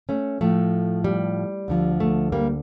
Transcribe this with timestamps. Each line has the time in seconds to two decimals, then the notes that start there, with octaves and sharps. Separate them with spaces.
0.09 A3 C#4
0.41 A2 F3 A3
1.04 G3
1.68 D2 D3 F3
2.00 A3
2.32 G3 A#3